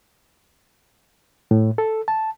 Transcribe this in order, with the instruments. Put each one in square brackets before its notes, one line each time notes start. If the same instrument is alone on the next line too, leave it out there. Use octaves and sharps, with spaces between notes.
[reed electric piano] A2
A4
A5